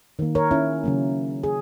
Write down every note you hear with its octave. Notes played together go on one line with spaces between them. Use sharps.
D#3 A#3
A#4 C#5
C#4 E4
C#3 F#3 A#3
G#4